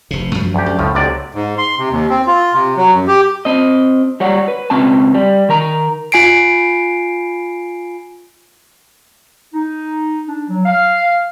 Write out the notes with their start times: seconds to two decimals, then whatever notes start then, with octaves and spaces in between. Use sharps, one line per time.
0.11 F1 C3
0.35 F#2 F3 F#3
0.54 D2 G4
0.66 F#2
0.79 C#2 A2 F3
0.95 B1 C3 D5
1.35 G#2
1.58 C6
1.78 C3
1.91 D#2
2.10 C4
2.27 F4
2.54 C3
2.77 F#3
2.93 F#2
3.07 G4
3.45 C4 D#5
4.20 G3 C#5 F#5
4.48 B4
4.70 C#2 C4 B4 A5
5.14 G3
5.49 D#3 A#4 A#5
6.12 F4 G#5 C7 D7
9.54 D#4
10.27 D4
10.49 F#3
10.66 F5